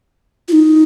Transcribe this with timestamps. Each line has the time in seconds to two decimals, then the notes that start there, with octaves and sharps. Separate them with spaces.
0.48 F4
0.52 D#4